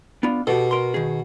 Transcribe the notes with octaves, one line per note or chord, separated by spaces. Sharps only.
B3 D4 F4
B2 G4 A4
A#4 C6
D#3 G#4